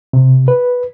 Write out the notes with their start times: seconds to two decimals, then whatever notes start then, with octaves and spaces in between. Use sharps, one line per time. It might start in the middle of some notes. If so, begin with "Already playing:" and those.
0.13 C3
0.48 B4